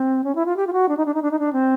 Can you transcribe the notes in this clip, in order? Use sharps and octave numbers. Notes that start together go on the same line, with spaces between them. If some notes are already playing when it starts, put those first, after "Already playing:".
Already playing: C4
C#4
E4
F4
G4
F4
F#4
D4
D#4
D4
D#4
D4
D#4
D4
C4